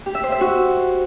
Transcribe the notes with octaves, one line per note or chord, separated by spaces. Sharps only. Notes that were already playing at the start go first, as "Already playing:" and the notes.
G4
E5
C5
E5
F#4